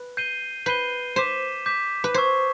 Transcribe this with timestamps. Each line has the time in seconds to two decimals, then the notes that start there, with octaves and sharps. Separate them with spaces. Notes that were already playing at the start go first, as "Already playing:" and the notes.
Already playing: B4
0.17 G6 C7 D#7 G7
0.66 B4 G6 C7 D#7 G7
1.16 C5 D6 G6 B6 E7
1.66 D6 G6 B6 E7
2.04 B4
2.14 C5 C#6 E6 G#6 C7